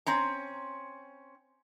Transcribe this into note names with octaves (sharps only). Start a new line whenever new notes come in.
C4 C#4 A#5